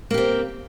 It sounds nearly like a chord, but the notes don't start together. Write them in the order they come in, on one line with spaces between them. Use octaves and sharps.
A#3 G4 C4